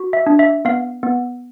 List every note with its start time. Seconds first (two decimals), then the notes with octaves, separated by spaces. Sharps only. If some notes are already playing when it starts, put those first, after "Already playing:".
Already playing: F#4
0.13 E5
0.27 D4
0.39 E5
0.65 B3 F5
1.03 B3